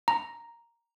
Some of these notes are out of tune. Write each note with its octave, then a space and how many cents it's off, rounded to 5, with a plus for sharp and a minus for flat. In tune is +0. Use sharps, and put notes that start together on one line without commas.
A#5 +0